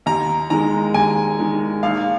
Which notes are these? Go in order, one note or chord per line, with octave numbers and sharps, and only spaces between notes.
D#2 A#5
D#3 G#3 A#5
D#2 G#5
D#3 G#3
A#1 F5